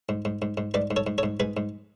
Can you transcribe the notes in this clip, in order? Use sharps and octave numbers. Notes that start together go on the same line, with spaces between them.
G#2
G#2
G#2
G#2
G#2 B4 D5
G#2
A4 C#5
G#2
A4 C#5
G#2
G#2 G#4 B4
G#2